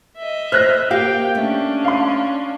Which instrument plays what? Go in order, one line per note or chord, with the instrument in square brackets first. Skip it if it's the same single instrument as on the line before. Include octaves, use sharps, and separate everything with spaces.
[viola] D#5 E5
[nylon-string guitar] C5 [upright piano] F6 F#6 A#6
[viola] A#3 G5 [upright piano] G4 [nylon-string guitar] F5
[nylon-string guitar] A3 [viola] C#4 D4
[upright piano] F5 C6